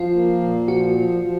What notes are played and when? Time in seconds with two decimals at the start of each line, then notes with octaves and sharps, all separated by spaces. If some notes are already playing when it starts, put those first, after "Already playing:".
Already playing: F3 F4
0.15 A#3
0.41 A#2
0.67 F3 F#4
0.95 F3
1.21 F3